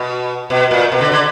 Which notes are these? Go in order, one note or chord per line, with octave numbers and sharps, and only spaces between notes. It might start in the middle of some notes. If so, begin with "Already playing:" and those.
Already playing: B2
B2
A#2
B2
D3
D3